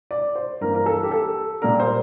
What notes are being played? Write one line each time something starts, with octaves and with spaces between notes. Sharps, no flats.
D5
C5
G2 E3 A#3 A#4
A#4
A4
G4
A4
A#2 G3 A#3 D4 A#4
C5